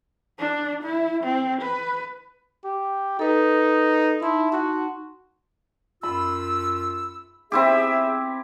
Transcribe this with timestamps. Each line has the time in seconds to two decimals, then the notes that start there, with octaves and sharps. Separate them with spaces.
0.39 D4
0.83 E4
1.24 C4
1.62 B4
2.65 G4
3.19 D#4 A4 B4
4.22 D#4 E4 A5 C6
4.52 F#4
6.03 F#2 F4 B5 E6
7.52 C4 E4 G4 G#4 E5